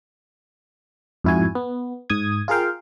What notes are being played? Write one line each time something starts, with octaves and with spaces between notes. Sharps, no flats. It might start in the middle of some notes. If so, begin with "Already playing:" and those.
F2 G#2 E4 F#4 G#5
B3
G#2 D#6 G#6
F4 G#4 A#4 F5 G5